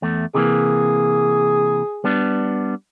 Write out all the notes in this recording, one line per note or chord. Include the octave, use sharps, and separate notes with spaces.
E2 A3
C3 E3 A#3 G#4
G3 B3 D4